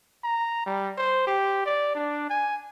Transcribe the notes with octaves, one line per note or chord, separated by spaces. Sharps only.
A#5
G3
C5
G4
D5
D4
G#5